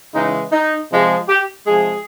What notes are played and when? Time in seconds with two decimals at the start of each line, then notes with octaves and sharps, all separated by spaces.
0.14 C#3 E3 G#3 D#4
0.52 D#4
0.90 C3 F3 G#3
1.29 G4
1.66 C3 F3 G#3 G#4